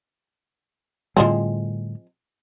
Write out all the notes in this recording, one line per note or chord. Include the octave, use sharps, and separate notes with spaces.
A2 D3 F3 G3 G#3 C4